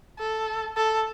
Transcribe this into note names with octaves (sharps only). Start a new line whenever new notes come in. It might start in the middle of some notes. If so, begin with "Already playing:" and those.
A4
A4